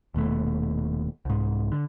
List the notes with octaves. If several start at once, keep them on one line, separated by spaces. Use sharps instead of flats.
D#1 D#2 B2 A3
C2 G#2
D3